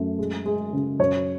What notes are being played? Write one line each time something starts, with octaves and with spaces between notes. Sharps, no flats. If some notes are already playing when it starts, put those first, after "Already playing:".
Already playing: F#2 A3
G#3
G#3
C#3
F#2 C#5